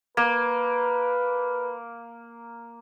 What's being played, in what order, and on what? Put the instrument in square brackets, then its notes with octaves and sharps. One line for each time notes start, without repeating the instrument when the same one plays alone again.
[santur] A#3 [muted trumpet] B4